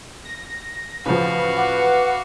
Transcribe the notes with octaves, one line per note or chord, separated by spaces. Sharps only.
A#6
A1 C#3 F3 F#4 B4 F5
F#5 D6